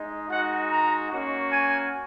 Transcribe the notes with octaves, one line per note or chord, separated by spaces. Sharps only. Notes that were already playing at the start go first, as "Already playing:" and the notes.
Already playing: G#3 D#4
G#3 D#4 F#4 F#5
A#5
A#3 C#4 F#4
G#5